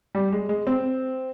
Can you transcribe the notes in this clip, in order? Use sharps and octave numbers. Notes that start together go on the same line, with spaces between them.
G3
G#3
G#3
C4